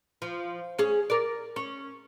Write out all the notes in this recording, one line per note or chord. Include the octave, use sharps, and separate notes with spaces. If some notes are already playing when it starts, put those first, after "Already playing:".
F3
C#4 G#4
A#4 D5
C#4